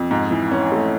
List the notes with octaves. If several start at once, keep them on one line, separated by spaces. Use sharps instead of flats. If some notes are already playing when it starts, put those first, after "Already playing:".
Already playing: F2
G#2
E3
C#4
A3